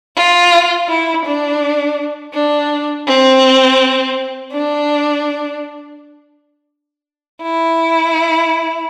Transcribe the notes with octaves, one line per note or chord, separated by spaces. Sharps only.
F4
E4
D4
D4
C4
D4
E4